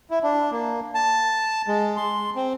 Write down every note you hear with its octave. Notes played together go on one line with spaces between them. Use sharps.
E4
D4
A#3
A5
G#3
C6
C4